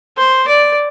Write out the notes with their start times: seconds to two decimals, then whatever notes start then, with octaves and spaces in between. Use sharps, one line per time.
0.17 C5
0.48 D5